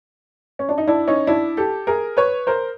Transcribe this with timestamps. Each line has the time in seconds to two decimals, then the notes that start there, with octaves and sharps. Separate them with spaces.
0.59 C#4
0.69 D4
0.78 D#4
0.87 D4 E4
1.08 C#4 D#4
1.27 D4 E4
1.57 G4 A4
1.87 G#4 A#4
2.17 B4 C#5
2.47 A#4 C5